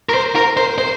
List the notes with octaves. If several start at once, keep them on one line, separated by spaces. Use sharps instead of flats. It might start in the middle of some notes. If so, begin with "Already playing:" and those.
A#4
C5
A#4
C5
C5